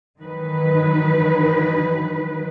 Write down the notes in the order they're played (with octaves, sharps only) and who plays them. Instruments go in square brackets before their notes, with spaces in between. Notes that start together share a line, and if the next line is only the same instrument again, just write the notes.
[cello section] D#3 E3 F#3 D#4 B4